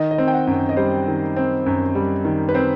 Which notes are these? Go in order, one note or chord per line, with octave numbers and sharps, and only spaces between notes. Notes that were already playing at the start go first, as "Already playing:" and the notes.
Already playing: D#3 D#5
D#5
C4
G5
F#5
F#2
D#5
G3 C5
D#3
C4
F#2
G3
D#3
B4
C4 C5